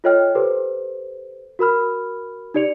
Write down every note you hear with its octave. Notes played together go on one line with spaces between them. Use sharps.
F4 A4 C#5 D#5 G5 F6
G4 A4 B4 C5
F#4 A#4 B5 F6
D#4 G4 D5 C#7 F7